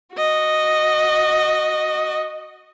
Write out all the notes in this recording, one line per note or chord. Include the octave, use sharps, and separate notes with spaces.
F#4 D#5